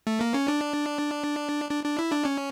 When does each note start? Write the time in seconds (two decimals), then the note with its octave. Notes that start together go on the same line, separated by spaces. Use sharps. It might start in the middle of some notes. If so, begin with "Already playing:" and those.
0.07 A3
0.21 A#3
0.34 C#4
0.48 D4
1.70 D4
1.84 D4
1.99 E4
2.11 D4
2.25 C#4